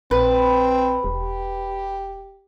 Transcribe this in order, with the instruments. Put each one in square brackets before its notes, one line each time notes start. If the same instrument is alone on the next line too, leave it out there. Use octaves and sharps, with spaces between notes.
[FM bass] A#1 [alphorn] C4 [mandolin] B4
[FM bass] E1 [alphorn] G4